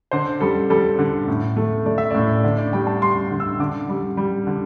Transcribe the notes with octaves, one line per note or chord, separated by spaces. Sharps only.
D3 C5
G3 A4
G3 A4
D3
A2
A3
A3 D5
E5
A2 D5
D3 D5
D5
G3 G5
A5
G3 C6
D3
E6
D3 D6
G3
G3
D3